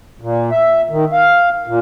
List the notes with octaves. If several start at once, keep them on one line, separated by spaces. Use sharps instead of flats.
A#2
E5
D#3
F5
A#2